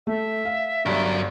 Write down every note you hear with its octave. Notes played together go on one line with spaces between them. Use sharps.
A3 E5
F5
G1 G2 F#3 A#4